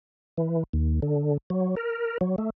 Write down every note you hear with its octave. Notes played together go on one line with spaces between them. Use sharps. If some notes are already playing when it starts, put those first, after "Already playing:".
E3
D#2
D3
F#3
A#4
F#3
A3